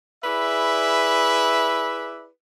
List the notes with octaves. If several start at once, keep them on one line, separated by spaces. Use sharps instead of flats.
E4 G#4 B4 D5 E5